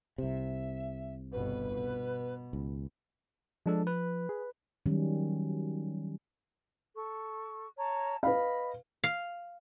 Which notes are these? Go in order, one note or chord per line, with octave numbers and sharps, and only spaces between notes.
C2 C3 E5
G1 B2 B4
B2
C#2
F3 G#3 D4 A4
B4
G#4
D#3 F#3 G3 C#4
A4 C#6
C#5 A5 A#5
B4 D#5 F5 B5
F5